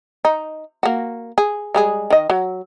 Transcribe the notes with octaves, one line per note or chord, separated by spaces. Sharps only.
D#4
A#3 F#4
G#4
G3 G#3 G#4
D#3 D#5
F#3